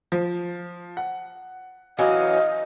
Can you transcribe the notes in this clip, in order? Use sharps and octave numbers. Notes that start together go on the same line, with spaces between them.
F3
F#5
E3 F#3 C#4 D#5 F5